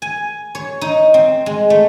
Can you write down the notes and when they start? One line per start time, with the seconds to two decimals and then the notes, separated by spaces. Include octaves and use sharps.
0.02 G#5
0.55 C#5
0.81 D#4
1.14 C4
1.46 G#3
1.70 A3